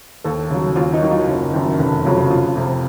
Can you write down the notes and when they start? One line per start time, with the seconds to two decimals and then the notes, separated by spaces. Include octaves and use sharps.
0.24 D#2 A4
0.50 C#3 F#3
0.76 D#2 F4
0.94 D#4
1.02 D#3 F#3
1.11 F4
1.28 F#1
1.54 F#2 D#3
1.79 F1
2.05 F2 C#3 F#3
2.30 F1 F4
2.56 F2 C3